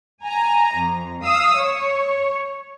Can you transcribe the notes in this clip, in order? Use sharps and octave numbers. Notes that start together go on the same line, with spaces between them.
G#5 A#5
F2
F5 D#6 E6
C#5